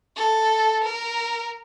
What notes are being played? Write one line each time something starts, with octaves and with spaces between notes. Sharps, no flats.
A4
A#4